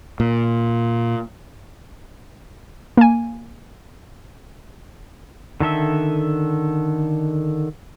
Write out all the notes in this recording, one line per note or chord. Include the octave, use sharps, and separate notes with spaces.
A#2
A#3 G#5
D3 D#3 A4 E5